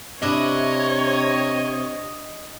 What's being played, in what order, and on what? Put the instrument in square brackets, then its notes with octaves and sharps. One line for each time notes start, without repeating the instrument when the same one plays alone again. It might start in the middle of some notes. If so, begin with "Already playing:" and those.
[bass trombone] C3 [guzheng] D4 E4 [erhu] C#5 [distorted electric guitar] D#5